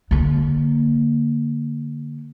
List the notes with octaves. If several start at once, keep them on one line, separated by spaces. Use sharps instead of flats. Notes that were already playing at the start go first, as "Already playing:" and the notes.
D3 A#3